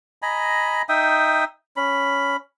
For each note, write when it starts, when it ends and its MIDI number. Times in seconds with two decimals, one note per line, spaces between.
0.22 0.82 75
0.22 0.82 80
0.22 0.82 82
0.22 0.82 83
0.89 1.44 63
0.89 1.44 76
0.89 1.44 79
0.89 1.44 87
1.76 2.36 61
1.76 2.36 83